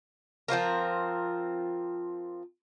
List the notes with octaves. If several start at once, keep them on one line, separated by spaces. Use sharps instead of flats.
F3 C4 F4 A#4